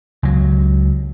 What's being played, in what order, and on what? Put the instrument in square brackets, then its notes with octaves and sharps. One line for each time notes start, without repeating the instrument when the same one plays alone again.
[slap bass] C#2 F#3